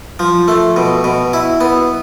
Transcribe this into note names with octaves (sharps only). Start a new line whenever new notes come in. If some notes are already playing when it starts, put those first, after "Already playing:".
F3
A3
B2
B2
E4
B3